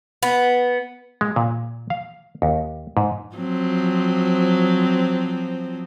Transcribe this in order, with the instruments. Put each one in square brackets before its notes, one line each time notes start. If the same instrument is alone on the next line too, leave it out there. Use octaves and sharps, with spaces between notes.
[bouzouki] B3
[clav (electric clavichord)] G#3
A#2
F5
D#2
G#2
[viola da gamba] F3 F#3 C4